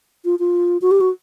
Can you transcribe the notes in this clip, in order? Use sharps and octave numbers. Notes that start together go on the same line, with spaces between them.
F4
F4
F#4
G4
F#4